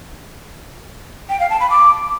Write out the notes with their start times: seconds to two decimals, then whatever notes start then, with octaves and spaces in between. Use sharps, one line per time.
1.30 G5
1.40 F5
1.50 A5
1.60 B5
1.70 D6